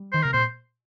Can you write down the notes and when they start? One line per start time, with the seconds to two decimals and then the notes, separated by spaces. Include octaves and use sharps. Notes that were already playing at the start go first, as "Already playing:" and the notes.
Already playing: G3
0.12 D#3 C5
0.23 C3 A#4
0.33 A#2 C5